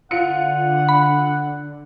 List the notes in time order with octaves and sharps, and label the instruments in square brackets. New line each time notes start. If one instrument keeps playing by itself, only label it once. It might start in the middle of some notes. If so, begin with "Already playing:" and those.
[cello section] D3 [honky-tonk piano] F4 C#7 [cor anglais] F#5
[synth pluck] B5